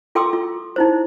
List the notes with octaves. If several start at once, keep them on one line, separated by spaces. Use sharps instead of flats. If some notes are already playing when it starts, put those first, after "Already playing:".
F4 A4 G5 C6 D6 E6
F4
D#4 E4 C5